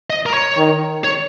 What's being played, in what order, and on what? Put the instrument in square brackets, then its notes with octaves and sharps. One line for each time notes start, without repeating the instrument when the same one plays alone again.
[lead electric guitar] D#5
A#4
C#5
[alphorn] D#3
[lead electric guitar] C#5